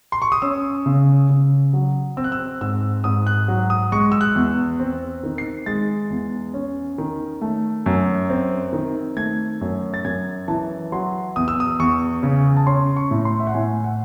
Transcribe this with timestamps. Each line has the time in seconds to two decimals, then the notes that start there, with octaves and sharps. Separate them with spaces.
0.12 C6
0.22 C#6
0.32 D#6
0.42 C#4 E6
0.86 C#3
1.30 C#3
1.73 F#3
2.17 C4 E6
2.24 F#6
2.32 E6
2.61 G#2 E6
3.04 G#2 D#6
3.27 F#6
3.48 F#3
3.70 D#6
3.92 G#3 C#6
4.12 E6
4.21 F#6
4.35 E2
4.80 C4
5.23 D#3
5.38 C7
5.66 G#3 A6
6.10 E2
6.54 C#4
6.98 D#3
7.41 A3
7.86 F#2
8.30 C4
8.73 D#3
9.17 A3 G#6
9.61 F#2
9.94 A6
10.04 F#2 G#6
10.48 E3 A5
10.92 F#3 C6
11.36 E2 D#6
11.48 E6
11.60 D#6
11.80 E2 C#6
12.23 C#3
12.57 A5
12.67 C#4 C6
12.97 C#6
13.11 A2
13.25 C6
13.40 E5
13.47 F#5
13.54 A2 G#5
13.84 F#5